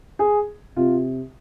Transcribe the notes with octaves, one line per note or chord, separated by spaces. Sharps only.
G#4
C3 F4